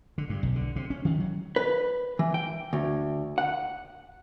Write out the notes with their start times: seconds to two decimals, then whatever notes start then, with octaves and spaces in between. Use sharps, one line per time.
0.18 D3
0.30 G2
0.43 B1
0.56 D3
0.76 C3
0.90 C#4
1.05 D#3
1.20 F#3
1.56 B4
2.19 E3
2.34 G5
2.73 D2
3.38 F#5